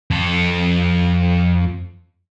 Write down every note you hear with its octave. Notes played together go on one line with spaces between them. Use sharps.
F2 A4